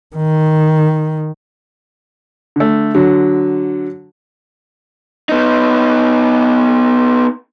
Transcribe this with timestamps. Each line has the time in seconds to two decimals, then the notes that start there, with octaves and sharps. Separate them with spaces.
0.16 D#3
2.56 D3 A3
2.95 D3 F#3
5.29 B3 D#4